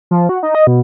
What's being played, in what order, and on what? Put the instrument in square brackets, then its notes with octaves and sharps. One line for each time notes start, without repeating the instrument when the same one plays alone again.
[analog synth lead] F3
F#4
D#4
D#5
B2